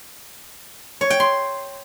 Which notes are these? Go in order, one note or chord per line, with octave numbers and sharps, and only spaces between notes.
C#5
G5
C6